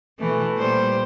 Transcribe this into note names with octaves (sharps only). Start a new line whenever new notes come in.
B2 E3 A3
A#2 G3 C5